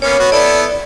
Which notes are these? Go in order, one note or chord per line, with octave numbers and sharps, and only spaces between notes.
A#3 B3 C#4 C#5
B3 F#4
B3 E4 A4 D5